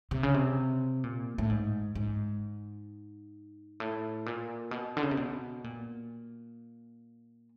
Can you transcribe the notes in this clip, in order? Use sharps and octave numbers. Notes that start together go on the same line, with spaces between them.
C3
C#3
C3
A#2
A2
G#2
G#2
A2
A#2
B2
D3
C#3
C3
B2
A#2